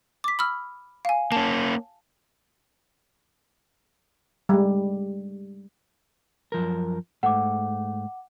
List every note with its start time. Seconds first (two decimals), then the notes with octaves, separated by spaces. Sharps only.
0.24 D6 B6
0.39 B5 E6 F6
1.05 F5 G#5
1.32 A#3 C#4 A5
4.49 G3 G#3
6.52 F#2 F3 A#4
7.23 G#2 A3 F#5 D6